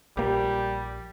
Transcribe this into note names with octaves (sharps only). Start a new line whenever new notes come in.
A#1 G3 A#3 G4